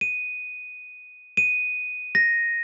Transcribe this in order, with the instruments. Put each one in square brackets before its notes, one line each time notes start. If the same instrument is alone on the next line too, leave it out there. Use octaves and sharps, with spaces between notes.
[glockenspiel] D#7
D#7
A#6